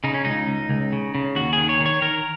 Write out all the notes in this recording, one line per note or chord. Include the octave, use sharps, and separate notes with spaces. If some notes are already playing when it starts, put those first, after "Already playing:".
C#3 D#4
C#4
C#2 D#4
C#2
C#2
C#3
C#3
D#2 F#4
D#3 G#4
C#5
D#3
C#5
D#3 A#4